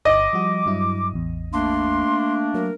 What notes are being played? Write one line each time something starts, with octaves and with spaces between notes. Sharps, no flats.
G1 D#5 D6
F3 G3 F#4
G2 F#3 E4
A1 E2
A3 A#3 D4 C6
F#3 A#4